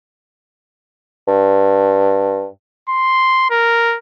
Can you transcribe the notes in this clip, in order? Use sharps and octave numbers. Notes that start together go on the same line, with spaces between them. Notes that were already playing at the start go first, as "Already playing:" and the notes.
G2
C6
A#4